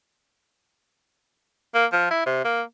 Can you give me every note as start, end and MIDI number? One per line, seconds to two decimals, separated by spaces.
1.75 1.85 58
1.92 2.08 53
2.11 2.23 64
2.26 2.43 48
2.45 2.61 58